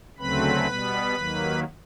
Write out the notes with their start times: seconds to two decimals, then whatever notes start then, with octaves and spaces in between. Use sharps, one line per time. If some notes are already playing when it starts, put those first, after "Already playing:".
0.19 D2 C#3 F#3 A3 C4 B4 B5
0.66 B2 G3 B3
1.15 D#2 D#3 F#3 A#3